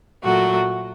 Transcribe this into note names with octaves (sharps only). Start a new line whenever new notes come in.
A#2 F#3 A3 F#4